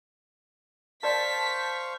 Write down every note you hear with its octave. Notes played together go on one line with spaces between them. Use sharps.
A#4 C5 D5 F5 A5 C#6 B6